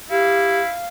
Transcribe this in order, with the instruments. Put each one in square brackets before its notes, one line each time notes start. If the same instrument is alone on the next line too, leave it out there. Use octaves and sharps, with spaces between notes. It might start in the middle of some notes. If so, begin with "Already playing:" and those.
[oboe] E4 [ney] G4 [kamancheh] F5